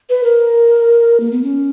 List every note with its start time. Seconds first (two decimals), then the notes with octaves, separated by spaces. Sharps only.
0.09 B4
0.24 A#4
1.20 A#3
1.31 B3
1.43 C#4